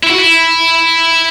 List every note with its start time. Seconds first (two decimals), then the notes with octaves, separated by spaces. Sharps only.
0.03 E4
0.10 F#4
0.18 E4